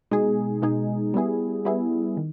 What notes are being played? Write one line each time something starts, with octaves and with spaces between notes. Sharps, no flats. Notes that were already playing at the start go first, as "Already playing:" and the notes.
B2 G#3 D#4 G#4
B2 G#3 D#4 G#4
G3 B3 E4 G#4
G3 B3 E4 G#4
D#3